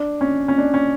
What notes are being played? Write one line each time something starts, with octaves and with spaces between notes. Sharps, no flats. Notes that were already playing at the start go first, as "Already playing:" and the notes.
Already playing: D4
C#4
C#4
D4
C#4